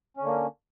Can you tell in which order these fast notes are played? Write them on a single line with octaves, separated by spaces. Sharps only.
C#4 D3 A#3